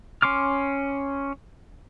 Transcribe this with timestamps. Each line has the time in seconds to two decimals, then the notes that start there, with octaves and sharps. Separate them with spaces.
0.22 C#4 C6 D6 F6